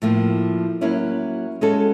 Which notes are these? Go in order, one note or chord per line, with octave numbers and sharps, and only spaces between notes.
A2 F3 A#3
F#3 A#3 C#4 E4
G#3 C#4 F#4 A4